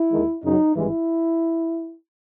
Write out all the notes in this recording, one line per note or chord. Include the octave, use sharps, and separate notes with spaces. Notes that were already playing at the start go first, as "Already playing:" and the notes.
Already playing: E4
D#2 D#3 G#3
F#2 C#3 F#3 D#4
G#1 G2 E3 G#3 E4